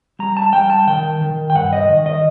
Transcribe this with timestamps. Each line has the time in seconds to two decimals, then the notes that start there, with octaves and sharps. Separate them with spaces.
0.19 G3 A#5
0.37 A5
0.53 G3 G5
0.70 A5
0.87 D#3 G5
1.21 D#3
1.50 G5
1.55 G2 F#5
1.73 D#5
1.89 D#3
2.06 D#5